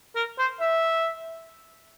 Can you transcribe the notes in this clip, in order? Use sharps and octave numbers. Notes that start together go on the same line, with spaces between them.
A#4
C5
E5